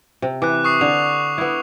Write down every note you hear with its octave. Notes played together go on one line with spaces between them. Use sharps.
C3
E3 D6 F#6
C#6 D#6 C7
D3 F7
B3 E4